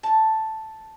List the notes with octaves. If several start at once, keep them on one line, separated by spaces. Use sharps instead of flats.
A5